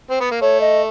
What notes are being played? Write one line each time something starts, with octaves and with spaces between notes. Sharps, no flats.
C4
B3
A#3
A3 C#5
D#5